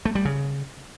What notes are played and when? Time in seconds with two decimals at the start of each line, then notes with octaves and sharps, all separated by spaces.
0.05 A3
0.15 G3
0.25 C#3